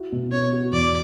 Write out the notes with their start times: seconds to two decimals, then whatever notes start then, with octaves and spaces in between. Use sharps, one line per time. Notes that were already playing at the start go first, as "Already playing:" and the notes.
Already playing: E4 F#4
0.12 B2
0.32 B3 C#5
0.53 F#4
0.72 E2 D5